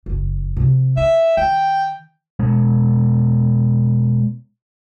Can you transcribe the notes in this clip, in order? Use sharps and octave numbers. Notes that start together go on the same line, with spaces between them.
F#1 F2
C3 F3
D#4 E5
D#3 G5
B2 G#3 B3